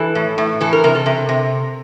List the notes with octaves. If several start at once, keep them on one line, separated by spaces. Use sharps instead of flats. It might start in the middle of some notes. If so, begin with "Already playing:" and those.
Already playing: E3 A4
A2
A2
E3 A4
A#4
C3 A#4
A4
C3
C3